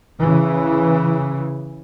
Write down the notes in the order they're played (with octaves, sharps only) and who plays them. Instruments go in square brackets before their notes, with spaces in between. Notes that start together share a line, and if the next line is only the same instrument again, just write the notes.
[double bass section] C#3 E3